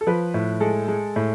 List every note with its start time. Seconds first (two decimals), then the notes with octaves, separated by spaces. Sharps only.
0.01 A4
0.07 F3 B4
0.34 A2
0.60 G#3 A4
0.88 G#3
1.16 A2